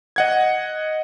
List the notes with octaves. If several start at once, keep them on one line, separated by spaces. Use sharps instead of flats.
D#5 F#5 G#6